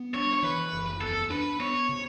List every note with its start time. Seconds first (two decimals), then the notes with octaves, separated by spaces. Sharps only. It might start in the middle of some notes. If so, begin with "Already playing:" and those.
Already playing: B3
0.14 D4 C#5
0.33 C#5
0.43 E3 B4
0.73 F#1
1.01 E2 A4
1.30 D4 B4
1.60 B3 C#5
1.89 C#3